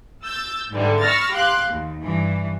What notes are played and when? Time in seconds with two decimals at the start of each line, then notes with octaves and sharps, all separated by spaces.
0.24 E6 G6 A6
0.71 G#2 D3 E3 G3
1.02 B5 C#6 E6 F6 A6 A#6
1.31 G4 F5 C6 F#6
1.69 D#2
2.02 G2 E3